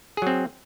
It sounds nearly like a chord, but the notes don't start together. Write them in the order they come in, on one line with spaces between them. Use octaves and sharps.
G#4 F#3 C4